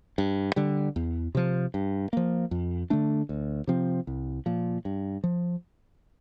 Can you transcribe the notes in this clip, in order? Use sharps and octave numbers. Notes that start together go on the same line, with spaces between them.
G2
D3 G3
E2
C3 F3
G2
F3 A#3
F2
D3 A3 D4
D2
C3 F3 C4
C2
A#2 F3
G2
F3